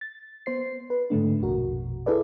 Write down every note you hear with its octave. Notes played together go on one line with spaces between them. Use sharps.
A6
B3 C5 C7
B4
G#2 D3 A3 D4
A#1 F2 B2 F#4 A#4
E4 G#4 A4 B4 D5